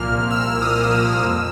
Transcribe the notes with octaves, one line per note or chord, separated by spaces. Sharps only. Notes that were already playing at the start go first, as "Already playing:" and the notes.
Already playing: C2 A#2 F3 A#3 F6
C2 E6
D#6
E6
A#2 F3 A#3 D#6
E6
F2